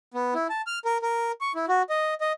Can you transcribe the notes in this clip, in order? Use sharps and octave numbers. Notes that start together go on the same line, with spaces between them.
B3
E4
A5
F6
A#4
A#4
C#6
E4
F#4
D#5
D#5